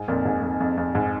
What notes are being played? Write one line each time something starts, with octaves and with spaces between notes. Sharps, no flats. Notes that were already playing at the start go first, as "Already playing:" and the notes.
Already playing: G#2
F2 A#2
G#2
F2
F2
F2
G#2